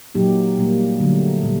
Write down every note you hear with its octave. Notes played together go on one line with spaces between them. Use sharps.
A#2 F#3 A#3 D#4 G4
A#2 G3 A#3
D3 F#3 A3
A#2 G3